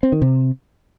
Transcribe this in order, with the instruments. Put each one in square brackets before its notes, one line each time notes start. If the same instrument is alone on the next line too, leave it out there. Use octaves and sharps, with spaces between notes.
[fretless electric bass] C4
D#3
C3